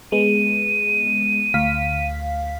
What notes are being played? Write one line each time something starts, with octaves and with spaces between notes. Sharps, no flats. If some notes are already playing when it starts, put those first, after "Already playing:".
G#3 B3 D#7
D2 F5 B6